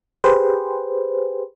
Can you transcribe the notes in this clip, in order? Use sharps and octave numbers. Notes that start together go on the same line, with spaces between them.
G4 G#4 B4 C5